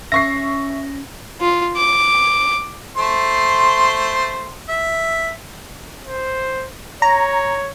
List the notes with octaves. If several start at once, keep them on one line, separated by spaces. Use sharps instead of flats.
C#4 E5 C#6 A#6 C7
F4
D6
A3 C5 C6
E5
C5
C#5 A#5